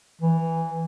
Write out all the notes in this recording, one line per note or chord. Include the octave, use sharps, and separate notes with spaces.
E3